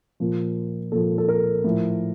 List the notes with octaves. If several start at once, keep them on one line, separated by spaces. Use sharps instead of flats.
A#2 F3
A#2 F3 A4
A4
A#4
A2 F3